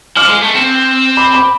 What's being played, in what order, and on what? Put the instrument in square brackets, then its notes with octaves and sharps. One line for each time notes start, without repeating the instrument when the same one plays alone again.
[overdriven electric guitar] F3 [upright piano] D6 F6
[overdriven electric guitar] G#3
A3
C4
[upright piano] B5 D6
B5 D6